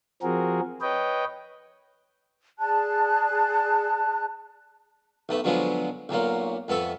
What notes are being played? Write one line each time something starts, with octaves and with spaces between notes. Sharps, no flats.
F3 C4 F#4 G#4 A#4
B4 C#5 D#5 G5
G#4 D5 A5 F#6
B1 A3 B4
B2 D3 F3 F#3 G#3 B3
B1 A#2 F#3 A#3
F2 B3 A4 E5 C#6